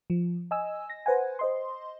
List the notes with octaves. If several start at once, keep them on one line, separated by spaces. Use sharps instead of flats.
F3
D#5 G#5 E6
A#6
B4 C5 F#5 G#5
C5 D#5 C6